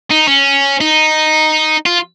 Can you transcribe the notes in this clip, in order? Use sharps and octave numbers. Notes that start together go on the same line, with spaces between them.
D#4
C#4
D#4
F4